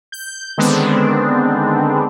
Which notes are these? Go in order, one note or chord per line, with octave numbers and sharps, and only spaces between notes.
G6
D3 D#3 G#3 B3 C4 D4